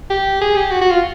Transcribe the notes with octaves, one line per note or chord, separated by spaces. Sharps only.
G4
G#4
G4
F#4
F#4
F4